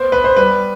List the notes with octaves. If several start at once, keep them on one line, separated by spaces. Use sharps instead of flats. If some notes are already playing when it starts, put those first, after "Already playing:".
Already playing: B3 C5
B3 B4
C5
G3 B4